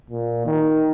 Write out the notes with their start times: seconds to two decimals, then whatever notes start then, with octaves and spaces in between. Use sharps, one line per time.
0.10 A#2
0.46 D#3